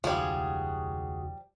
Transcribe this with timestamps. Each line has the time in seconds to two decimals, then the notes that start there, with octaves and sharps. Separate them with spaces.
0.04 E1 C#2 D#3 F3 G3 F#4 G#4